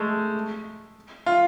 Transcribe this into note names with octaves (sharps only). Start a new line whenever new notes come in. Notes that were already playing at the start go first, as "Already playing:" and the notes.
Already playing: G#3 A3
F4